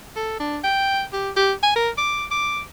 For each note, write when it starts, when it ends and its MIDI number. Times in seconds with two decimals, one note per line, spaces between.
0.16 0.36 69
0.40 0.59 62
0.64 1.02 79
1.13 1.30 67
1.36 1.53 67
1.63 1.72 80
1.76 1.90 70
1.98 2.25 86
2.31 2.62 86